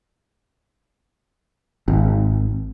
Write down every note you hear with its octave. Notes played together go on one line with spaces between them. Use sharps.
G#1